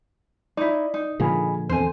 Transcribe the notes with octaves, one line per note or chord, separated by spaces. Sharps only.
D#4 E4 D5
D#4
A#2 D3 F3 A#3 G#4 G#5 B5
E2 C4 A4 C5 G#5